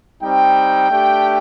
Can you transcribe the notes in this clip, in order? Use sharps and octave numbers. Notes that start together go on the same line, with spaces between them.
G3 C4 D#4 G5
A3 D4 G4